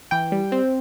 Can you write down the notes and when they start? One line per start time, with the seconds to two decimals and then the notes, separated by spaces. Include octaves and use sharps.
0.11 E3 G5
0.32 G3
0.52 C4